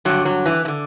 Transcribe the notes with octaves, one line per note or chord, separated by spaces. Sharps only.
G2 D3 F#3
F#3
E3
E3
D3